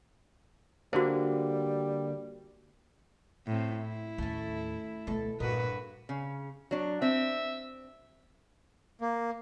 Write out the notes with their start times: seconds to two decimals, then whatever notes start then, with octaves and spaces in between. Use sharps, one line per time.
0.93 D3 G3 A#3 F#4 C5
3.47 A2 C4
3.78 E4
4.18 D#2 A2 A3 C#4
5.07 D2 B2 A3 A4
5.40 G2 A#2 F#4 A#4 B4 D#5
6.09 C#3
6.71 F#3 D4
7.02 C4 E5
9.01 A#3